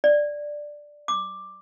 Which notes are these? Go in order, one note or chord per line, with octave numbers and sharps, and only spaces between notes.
D5
D6